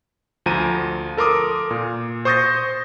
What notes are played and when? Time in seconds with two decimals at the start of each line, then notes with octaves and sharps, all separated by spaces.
0.46 D2 F3 A#5 D#7
1.17 A4 A#4 C6 D6 D#6
1.71 A#2
2.25 C5 C#6 D#6 G6 A6 A#6